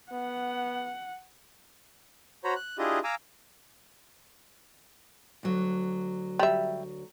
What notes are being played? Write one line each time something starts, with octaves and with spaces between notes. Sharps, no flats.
B3 F#5
F#4 C5 C#5 A#5 B5
F#6
D4 E4 F4 G4 G#4 D#5
F5 G#5 A#5 D6 E6
D2 F#3
G3 E5